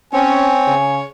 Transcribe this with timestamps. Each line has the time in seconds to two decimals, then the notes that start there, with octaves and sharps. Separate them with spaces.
0.13 C4 C#4 C#5 G#5
0.67 C#3